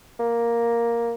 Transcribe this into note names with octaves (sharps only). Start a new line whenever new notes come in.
A#3